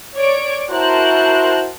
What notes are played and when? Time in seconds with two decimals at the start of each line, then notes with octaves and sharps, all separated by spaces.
0.16 C#5 D5 D7
0.71 E4 F#4 A#4 C5 A5 F#6